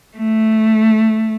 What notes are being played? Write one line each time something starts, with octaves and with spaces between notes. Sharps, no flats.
A3